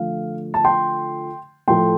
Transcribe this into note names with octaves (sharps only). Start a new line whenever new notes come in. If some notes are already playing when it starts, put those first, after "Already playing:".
Already playing: D3 F3 A3 F5
A5
G5 C6
A2 F3 A3 G5 C6